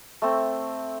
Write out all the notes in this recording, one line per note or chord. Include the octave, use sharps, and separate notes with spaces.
A3 C4